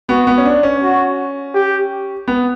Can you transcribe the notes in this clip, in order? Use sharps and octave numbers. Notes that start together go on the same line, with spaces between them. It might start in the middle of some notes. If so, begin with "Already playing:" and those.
B3 F#4
B3
C#4
D4
C#4
F#4
G4
B3